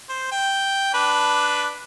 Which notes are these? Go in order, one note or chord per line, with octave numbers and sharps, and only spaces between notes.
C5
G5
D4 B4